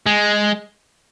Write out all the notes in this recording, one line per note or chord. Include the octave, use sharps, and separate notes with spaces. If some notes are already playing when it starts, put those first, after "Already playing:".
G#3